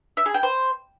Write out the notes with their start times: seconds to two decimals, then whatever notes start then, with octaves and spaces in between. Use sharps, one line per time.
0.17 E5
0.26 G#4
0.34 G5
0.43 C5